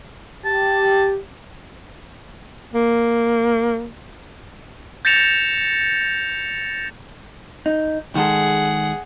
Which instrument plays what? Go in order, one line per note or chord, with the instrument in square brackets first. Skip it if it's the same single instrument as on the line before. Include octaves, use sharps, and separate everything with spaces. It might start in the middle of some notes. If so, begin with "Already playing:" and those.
[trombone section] G4 [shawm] A5
[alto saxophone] A#3
[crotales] G6 A6 A#6 C#7 E7 F7
[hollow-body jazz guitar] D#4
[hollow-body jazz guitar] D#3 G#3 A4 [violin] G#4 F#5